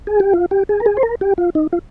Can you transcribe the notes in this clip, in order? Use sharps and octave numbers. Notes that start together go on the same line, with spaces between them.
G#4
G4
F4
G4
G#4
A#4
G#4
C5
A#4
G4
F4
D#4
F4